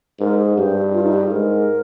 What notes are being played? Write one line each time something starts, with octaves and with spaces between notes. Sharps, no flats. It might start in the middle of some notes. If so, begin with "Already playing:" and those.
G#2 A#4
G#4
G2 G4
F4
D#4
G4
G#4
G#2 A#4